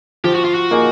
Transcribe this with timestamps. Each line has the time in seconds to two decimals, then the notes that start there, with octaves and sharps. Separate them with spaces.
0.24 F3 G4
0.34 F#4
0.45 F4
0.54 F#4
0.71 A#3 D#4 G#4